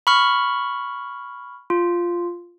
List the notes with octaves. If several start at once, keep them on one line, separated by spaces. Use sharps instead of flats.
B5 C#6 F6
F4